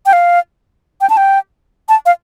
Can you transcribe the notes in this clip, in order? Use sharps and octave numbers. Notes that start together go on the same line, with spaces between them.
G5
F5
G5
A5
G5
A5
F5